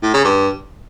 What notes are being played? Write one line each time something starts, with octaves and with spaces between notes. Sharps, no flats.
A2
C#3
G2